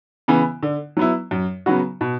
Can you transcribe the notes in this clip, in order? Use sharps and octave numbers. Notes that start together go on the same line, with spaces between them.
C#3 E3 B3
D3
F#3 B3 E4
F#2
C#3 F#3 B3 F#4
B2